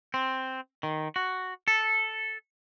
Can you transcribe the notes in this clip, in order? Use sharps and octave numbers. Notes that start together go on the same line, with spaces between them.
C4
D#3
F#4
A4